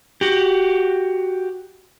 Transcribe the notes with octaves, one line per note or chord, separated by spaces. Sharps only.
F#4 G4